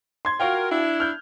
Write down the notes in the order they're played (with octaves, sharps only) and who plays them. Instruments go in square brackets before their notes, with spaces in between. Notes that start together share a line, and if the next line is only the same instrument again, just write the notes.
[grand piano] C6 G#6
[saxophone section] F4 A#4 [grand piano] F#4 F5 G5
[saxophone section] D4 E4
[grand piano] F6 G6